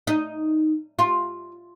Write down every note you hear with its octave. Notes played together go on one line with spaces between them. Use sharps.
D#4
F4